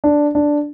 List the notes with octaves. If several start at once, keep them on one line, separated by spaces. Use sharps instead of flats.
D4
D4